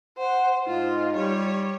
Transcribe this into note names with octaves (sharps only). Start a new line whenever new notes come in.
C5 F#5
G#2 D#4 F4
G3 C#5